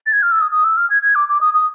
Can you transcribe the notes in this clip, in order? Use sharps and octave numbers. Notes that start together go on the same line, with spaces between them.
A6
G#6
F6
E6
D#6
D#6
E6
F6
G#6
G#6
D6
D6
D#6
D#6